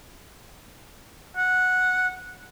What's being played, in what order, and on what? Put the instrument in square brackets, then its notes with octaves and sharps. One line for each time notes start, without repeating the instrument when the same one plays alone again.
[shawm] F#5